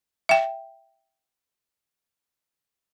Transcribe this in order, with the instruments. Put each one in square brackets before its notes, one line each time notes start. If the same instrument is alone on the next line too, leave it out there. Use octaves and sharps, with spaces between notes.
[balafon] E5 G5